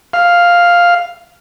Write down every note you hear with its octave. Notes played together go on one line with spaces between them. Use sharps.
F5